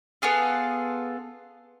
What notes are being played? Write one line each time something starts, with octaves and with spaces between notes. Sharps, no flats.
B3 F4 G#4 A4